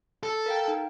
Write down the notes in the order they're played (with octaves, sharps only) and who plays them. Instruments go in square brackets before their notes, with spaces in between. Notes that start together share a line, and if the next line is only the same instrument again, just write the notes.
[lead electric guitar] A4
[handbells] A#4 F5 G5
D#4